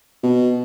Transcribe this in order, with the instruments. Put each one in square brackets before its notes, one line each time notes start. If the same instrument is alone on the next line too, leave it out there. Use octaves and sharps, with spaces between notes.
[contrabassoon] B2